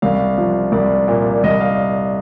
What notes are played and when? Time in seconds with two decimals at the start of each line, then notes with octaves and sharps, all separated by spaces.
0.02 C2 F5
0.38 F3
0.72 C2 D5
1.08 A#2
1.43 C2 D#5
1.60 F5